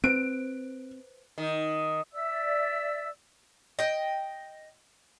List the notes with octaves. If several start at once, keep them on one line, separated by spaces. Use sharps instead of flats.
C4 B4 C5 F#6 D7
D#3
D5 E5 E6
D#5 G5